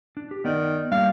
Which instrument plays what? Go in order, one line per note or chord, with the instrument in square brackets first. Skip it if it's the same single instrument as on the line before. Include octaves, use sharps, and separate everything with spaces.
[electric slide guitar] D4
G4
[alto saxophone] D#3 [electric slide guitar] B3 D5
[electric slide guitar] G3 A#3 D4 [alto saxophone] F5